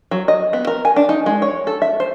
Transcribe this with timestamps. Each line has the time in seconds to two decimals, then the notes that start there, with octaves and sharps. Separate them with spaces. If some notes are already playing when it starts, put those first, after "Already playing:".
0.11 F#3
0.28 D#5
0.53 B3
0.67 A#4
0.85 G#5
0.96 D4
1.09 D#4
1.26 G#3
1.42 C#5
1.67 A4
1.82 E5
2.00 C5